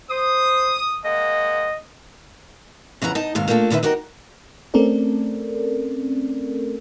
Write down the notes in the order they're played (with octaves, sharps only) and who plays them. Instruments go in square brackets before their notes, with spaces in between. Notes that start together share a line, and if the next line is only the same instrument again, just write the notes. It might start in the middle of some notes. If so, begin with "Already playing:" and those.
[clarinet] C5 [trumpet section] D#6
[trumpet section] G#3 A#3 F#5 [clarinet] D#5
[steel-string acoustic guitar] F2 C#3 E3 F#5 A#5
D#4 D#5 A5
D#2 G#2 C3 D#3 F5
A3 A#3 D4 F4 A4
E2 D3 D#3 B4 E5
D#4 F#4 G4 A#4
[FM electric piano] A3 C4 C#4 A4 A#4 D5